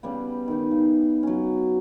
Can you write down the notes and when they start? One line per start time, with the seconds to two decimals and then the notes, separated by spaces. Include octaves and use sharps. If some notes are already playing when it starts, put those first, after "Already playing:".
0.03 C#3 G3 B3
0.48 D#3 D#4
0.71 C#3
1.23 F#3 C#4